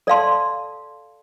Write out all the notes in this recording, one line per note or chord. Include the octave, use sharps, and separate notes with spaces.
A4 D5 F5 A5 C6